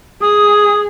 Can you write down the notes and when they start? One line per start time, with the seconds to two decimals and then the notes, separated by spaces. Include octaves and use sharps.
0.21 G#4 D#6